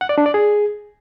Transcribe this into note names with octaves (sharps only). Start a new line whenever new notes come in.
F#5
D5
D4
D5
G#4